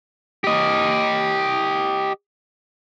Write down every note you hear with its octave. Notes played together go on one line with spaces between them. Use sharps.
G4 D#5